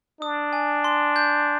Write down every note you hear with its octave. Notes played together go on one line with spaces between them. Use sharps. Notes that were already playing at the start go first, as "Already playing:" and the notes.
D4 D#6
G#5
C6
G6